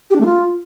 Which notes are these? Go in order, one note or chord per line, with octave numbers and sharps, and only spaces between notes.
G4
D4
A3
F4